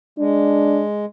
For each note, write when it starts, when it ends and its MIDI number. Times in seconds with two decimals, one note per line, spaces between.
0.19 1.05 56
0.19 0.83 62